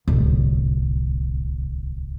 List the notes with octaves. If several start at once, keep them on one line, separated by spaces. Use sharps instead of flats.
D1 C2